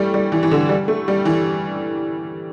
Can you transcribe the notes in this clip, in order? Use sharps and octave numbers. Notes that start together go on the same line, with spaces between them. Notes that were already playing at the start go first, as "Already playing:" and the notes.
Already playing: E3 G3 A3
G3
E3
E3
D3
G3
A3
G3
E3